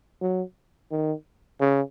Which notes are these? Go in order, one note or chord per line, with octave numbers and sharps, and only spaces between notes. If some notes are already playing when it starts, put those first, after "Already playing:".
F#3
D#3
C#3